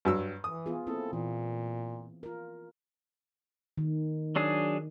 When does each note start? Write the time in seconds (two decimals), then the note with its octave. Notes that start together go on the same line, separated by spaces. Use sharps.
0.05 G2 F#3 E6
0.44 E3 D#6
0.66 B3 F4 G#4
0.87 A#3 C4 E4 A4
1.13 A#2 E3
2.23 F4 A#4
3.78 D#3
4.36 F#3 D4 G#4